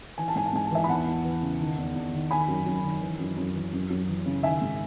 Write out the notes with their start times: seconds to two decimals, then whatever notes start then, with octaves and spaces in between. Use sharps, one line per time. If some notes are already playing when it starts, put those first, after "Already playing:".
0.18 E3 G#5
0.28 A5
0.36 G#2 G#5
0.46 A5
0.53 G#2 G#5
0.65 A5
0.71 E3 E5 G#5
0.84 B5
0.89 E2 F#5 A5
1.07 E2
1.25 E3
1.42 C#3
1.61 D#3
1.78 E2
1.95 E2
2.13 D#3
2.30 D#3 G#5 B5
2.48 F#2
2.66 F#2
2.84 D#3
3.02 E3
3.20 F#2
3.37 F#2
3.56 E3
3.73 F#2
3.90 F#2
4.09 E3
4.26 C#3
4.43 D#3 E5 G#5
4.61 G#2